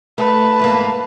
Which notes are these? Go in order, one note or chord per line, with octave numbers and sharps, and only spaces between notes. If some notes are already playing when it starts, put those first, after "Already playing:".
A3 B4 A5
E2 G#2 A#3